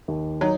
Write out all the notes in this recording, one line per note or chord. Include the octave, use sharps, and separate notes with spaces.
D#2
F#3 D#4